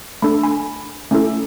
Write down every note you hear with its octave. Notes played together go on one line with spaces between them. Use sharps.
A3 D4 A4 B5
G#5 B5
A3 C#4 E4 A4